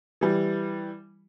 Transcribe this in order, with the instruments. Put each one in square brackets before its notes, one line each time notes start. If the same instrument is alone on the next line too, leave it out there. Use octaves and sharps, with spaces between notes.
[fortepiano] E3 G3